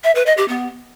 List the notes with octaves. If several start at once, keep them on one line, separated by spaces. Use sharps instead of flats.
E5
B4
D#5
G4
B3